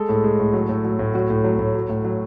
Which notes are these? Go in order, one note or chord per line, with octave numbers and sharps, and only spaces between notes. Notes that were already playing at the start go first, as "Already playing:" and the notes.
Already playing: G#3 A4
A2
G#3
A2
F#3
A2
F#3
A2
F#3 F#4
A2
F#3
A2
F#3
A2
F#3